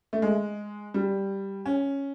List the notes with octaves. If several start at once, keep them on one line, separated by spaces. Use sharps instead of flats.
A3
G#3
G3
C#4